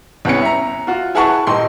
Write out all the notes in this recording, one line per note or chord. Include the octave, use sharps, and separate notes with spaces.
C2 B3 C#4 C#7
E5 A#5
F4 F#4
E4 G#4 B4 F#5 A5 C#6
D#1 D#4 G5 C6